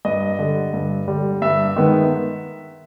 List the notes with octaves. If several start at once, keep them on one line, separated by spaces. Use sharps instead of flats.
G2 D#5
D3 G3
G2
D3 G3
G2 E5
D#3 G#3 B3